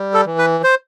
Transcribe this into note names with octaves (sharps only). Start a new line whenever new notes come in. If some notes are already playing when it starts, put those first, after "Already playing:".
Already playing: G3
A4
E3
B4
C5